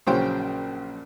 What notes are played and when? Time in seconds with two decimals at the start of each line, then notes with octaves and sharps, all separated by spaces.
0.07 A#1 C#3 F#3 C5 C#5 G5